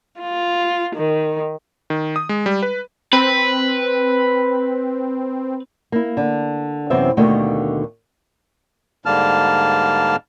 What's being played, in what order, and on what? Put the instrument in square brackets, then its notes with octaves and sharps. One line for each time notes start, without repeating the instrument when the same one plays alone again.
[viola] F4
D#3
[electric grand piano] D#3
D#6
G#3
G3
B4
[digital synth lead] C4 [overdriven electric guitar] B4
[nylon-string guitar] A#3 E4
D3
F#2 C3 E3 B3 C4 E5
D#2 B2 D3 D#3 A3 A#3
[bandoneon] G#2 D3 G3 A#3 A5 F6